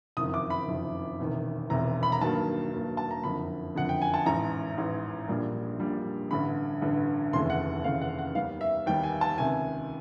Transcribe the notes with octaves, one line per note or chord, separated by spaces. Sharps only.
F#1 F2 C3 D#3 D#6
D6
B5
F#1 F2 C3 D#3
E1 E2 C3 D#3
E1 E2 C3 D#3 A#5
B5
A#5
G2 D#3 F#3 A#3 A5
G2 D#3 F#3 A#3
A5
A#5
F#1 F2 D3 B5
F#1 F2 D3 F#5
G5
G#5
A5
A1 G#2 E3 A#5
A1 G#2 E3
A#1 A#2 G3 A#3 D4
A#1 A#2 G3 A#3 D4
A1 G2 D3 B5
A1 G2 D3
F1 D#2 C#3 E3 A3 C6
F#5
F1 D#2 C#3 E3 A3 F5
F#5
F#5
D#2 D#3 G3 B3 F5
E5
D#2 D#3 G3 B3 G5
G#5
A5
C#2 C3 D#3 G#5